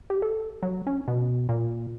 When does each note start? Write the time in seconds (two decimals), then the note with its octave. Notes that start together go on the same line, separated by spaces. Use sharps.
0.10 G4
0.22 A4
0.63 F#3
0.87 C#4
1.08 B2
1.49 A#2